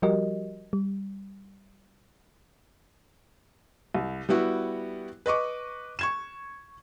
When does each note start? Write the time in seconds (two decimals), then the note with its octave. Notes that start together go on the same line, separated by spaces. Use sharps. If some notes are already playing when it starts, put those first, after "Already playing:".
0.02 F3 G3 F#4 G4 A#4 D#5
0.73 G3
3.94 C2
4.29 G3 B3 E4 F#4
5.26 B4 D#5 C#6 D6
5.99 C#6 G#6 E7